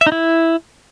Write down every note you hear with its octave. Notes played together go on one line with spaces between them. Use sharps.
E5
D#4
E4